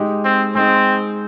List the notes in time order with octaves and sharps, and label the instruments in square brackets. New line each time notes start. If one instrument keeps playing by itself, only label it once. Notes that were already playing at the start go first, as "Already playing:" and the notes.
Already playing: [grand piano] G#3 D#4 G4
[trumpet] C4
[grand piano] G#3 D#4 G#4 [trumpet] C4